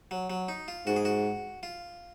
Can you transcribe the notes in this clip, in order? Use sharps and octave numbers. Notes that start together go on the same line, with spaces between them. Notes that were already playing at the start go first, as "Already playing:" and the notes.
F#3
F#3
D#4
F4
G#2 F#4
G#4
F#4
F4